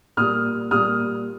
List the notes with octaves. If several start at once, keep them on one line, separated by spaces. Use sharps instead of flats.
A#2 G3 D#6 F6
A#2 G3 D#6 F6